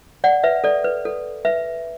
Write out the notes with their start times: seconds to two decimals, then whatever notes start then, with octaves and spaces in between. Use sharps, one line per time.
0.24 D5 F#5
0.44 B4 E5
0.64 A4 D5
0.84 B4
1.05 A4
1.45 B4 E5